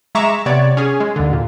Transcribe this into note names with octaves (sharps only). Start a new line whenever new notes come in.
G#3 E5 A#5 C#6 D6 E7
C3 B3 C#5 D5
C#4 G#4
G#3
D#2 D3
A#2